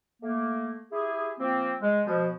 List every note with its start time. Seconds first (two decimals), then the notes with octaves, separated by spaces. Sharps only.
0.22 A3 A#3
0.92 E4 G4 G#4
1.39 F3 A#3 C4
1.81 G#3
2.06 B2 F3